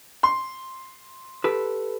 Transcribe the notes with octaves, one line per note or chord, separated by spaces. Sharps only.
C6
G4 A4 B4